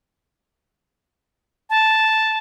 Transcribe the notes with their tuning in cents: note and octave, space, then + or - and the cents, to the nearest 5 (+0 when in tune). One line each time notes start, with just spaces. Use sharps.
A5 -5